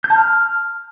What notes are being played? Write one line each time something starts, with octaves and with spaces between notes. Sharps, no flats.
G6
A5
F6